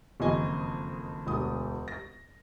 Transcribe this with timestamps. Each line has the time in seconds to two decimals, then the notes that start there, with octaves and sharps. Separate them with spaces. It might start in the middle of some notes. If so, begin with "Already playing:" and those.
0.20 F#1 F2 D#3 D#5 G#5
1.27 E1 D2 D#6
1.88 A#6